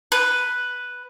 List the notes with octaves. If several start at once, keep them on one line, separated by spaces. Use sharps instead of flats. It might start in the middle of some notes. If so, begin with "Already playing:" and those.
B4